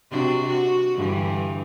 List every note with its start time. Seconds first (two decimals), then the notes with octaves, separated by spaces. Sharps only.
0.11 C3 D4 F#4
0.48 F#4
0.96 G2 D3 E3